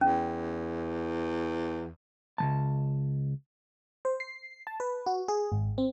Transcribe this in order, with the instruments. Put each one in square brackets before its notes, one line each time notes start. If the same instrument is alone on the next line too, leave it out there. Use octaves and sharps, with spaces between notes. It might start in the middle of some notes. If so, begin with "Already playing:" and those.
[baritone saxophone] E2 [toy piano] C#4
[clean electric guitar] C#2 E3 A5
[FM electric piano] C5
C7
A5
B4
F#4
G#4
G#1
C4